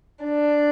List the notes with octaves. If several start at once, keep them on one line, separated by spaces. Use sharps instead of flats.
D4